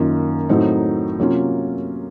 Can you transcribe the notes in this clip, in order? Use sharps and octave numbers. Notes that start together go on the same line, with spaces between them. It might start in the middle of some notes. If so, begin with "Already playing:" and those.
Already playing: F#2 D#3 A#3 F4
A2 F#3 C4 D#4
C3 F#3 A#3 C#4 F4